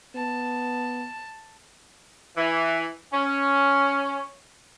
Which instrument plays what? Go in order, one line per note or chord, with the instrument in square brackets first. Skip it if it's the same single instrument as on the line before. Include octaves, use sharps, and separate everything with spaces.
[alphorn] B3 [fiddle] A5
[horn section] E3
C#4